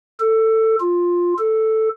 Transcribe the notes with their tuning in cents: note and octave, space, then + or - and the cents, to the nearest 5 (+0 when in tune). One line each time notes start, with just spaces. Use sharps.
A4 +15
F4 +5
A4 +0